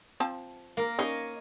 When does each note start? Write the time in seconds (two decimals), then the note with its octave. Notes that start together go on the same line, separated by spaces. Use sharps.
0.20 F3 C4 A5
0.77 A#3 A#4
0.99 C#4 D#4 C#5 D#5 F5